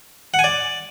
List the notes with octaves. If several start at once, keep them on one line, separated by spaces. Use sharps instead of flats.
F#5
G#5
D5